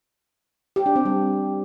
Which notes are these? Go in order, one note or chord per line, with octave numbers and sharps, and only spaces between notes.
G4
D4
C4
G3